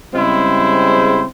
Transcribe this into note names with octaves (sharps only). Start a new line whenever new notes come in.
C#3 G3 G#3 C4 E4 C5